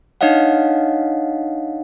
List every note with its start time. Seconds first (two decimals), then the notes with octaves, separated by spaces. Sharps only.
0.21 D4 D#4 C#5 D#5 F5 F#5